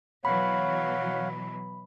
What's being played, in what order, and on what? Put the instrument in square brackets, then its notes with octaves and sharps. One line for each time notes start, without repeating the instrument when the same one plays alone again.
[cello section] B2 E3 F#3 [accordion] C#5 F5 F#5 [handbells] B5